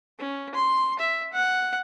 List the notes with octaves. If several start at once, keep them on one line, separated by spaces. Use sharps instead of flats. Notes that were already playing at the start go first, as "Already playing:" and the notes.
C#4
C6
E5
F#5